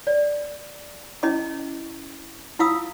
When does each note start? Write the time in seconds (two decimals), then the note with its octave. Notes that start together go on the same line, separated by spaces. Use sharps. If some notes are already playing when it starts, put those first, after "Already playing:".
0.07 D5
1.23 C#4 E4 D#5 D6
2.59 E4 F4 F5 D#6 E6